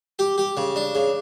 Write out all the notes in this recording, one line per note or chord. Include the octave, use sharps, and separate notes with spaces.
G4
G4
C#3
D4
C#3